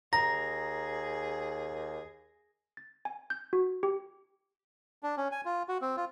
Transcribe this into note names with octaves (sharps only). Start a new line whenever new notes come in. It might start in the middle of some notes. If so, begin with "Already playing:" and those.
D#2 G#4 A#5 A#6
A6
G#5
G6
F#4
G4
D4
C#4
G#5
F4
F#4
C4
F4